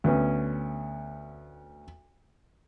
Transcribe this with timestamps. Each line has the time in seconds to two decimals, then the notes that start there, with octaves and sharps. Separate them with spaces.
0.04 D2 B3 C#4